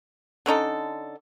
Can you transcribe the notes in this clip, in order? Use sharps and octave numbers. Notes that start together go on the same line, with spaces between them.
D3 C#4 D#4 A4